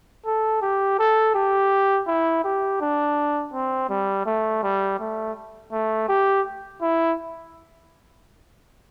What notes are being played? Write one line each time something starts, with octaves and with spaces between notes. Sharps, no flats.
A4
G4
A4
G4
E4
G4
D4
C4
G3
A3
G3
A3
A3
G4
E4